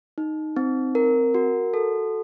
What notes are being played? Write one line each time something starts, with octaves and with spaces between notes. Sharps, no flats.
D#4
C4
A#4
F#4
A4